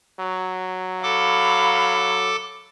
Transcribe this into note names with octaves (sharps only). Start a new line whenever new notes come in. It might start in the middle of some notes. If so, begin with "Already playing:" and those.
F#3
A4 F5 B5 D6